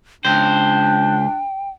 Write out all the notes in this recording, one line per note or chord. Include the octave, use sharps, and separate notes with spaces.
C#2 D4 C5 G5